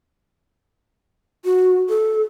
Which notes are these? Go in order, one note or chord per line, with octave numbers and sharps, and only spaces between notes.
F#4
A4